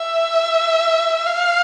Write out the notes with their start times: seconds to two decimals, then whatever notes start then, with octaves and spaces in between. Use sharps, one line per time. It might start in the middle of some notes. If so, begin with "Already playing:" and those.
Already playing: E5
1.26 F5